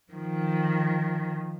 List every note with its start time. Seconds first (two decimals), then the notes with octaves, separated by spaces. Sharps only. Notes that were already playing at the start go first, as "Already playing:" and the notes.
0.12 D#3 F3